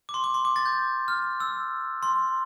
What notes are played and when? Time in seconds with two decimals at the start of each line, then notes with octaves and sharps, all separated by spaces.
0.09 D6
0.14 C6
0.24 D6
0.34 C6
0.45 D6
0.56 A6
0.66 G6
1.08 F6
1.40 E6
2.03 C6